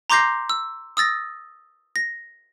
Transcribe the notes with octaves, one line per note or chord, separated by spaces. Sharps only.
A#5 C6 D6 G6 A#6 C7
E6
D#6 E6 A6 A#6
A#6